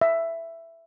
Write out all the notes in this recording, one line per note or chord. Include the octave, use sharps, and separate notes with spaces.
E5